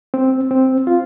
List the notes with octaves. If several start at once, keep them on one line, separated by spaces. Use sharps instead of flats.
C4
C4
F4